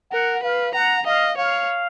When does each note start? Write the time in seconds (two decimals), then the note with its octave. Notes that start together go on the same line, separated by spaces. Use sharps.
0.12 A#4 F#5
0.43 B4 F5
0.74 F#5 A#5
1.06 D#5 F5
1.37 C#5 F5